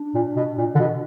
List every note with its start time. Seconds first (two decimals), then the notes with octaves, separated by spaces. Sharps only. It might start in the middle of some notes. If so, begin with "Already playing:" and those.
Already playing: D4
0.14 A#2
0.36 B2
0.58 A#2
0.75 D3
0.79 B2